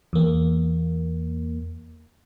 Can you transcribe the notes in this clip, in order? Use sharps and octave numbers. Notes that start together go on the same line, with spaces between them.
E2 A#3